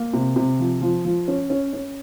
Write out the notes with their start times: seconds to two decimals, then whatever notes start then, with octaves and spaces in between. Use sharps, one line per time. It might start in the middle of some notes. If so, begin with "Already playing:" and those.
Already playing: A#3
0.14 C3
0.36 C3
0.59 F3
0.82 F3
1.05 F3
1.28 C#4
1.50 C#4
1.73 C#4